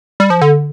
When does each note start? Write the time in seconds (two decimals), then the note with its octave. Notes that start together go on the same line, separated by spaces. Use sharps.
0.20 G3
0.30 F3
0.41 D3